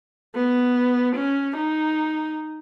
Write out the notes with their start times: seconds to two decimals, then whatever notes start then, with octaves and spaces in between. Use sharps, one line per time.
0.35 B3
1.16 C#4
1.57 D#4